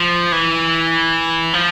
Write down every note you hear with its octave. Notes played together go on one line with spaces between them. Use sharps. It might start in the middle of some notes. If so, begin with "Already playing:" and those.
Already playing: F3
E3
F3